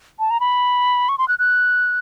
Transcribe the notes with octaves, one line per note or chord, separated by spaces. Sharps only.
A5
A#5
B5
C#6
C6
F#6
F#6